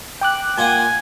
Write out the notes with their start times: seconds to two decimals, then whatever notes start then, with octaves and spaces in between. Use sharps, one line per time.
0.21 G5 D6 F#6
0.58 A#2 F4 F#5 G#5